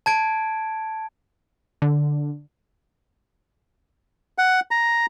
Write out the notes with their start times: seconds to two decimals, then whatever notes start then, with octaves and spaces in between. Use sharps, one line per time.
0.06 A5 G#6 D7
1.82 D3
4.38 F#5
4.71 A#5